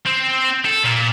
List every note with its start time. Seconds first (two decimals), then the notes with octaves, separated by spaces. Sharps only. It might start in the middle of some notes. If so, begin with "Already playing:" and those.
0.06 C4
0.65 A4
0.84 A#2